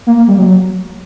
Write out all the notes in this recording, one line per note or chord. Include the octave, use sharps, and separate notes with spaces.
A#3
A#3
G3
F#3